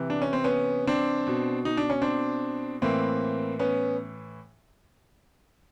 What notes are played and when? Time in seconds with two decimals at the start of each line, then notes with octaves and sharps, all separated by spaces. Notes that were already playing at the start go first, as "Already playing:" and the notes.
Already playing: C3 E3
0.10 D4
0.22 C#4
0.33 C4
0.44 B3 C#4
0.87 C4 D4
1.27 B2
1.65 D#4
1.77 D4
1.90 C#4
2.02 C4 D4
2.82 A2 E3 A#3 C4
3.59 B3 C#4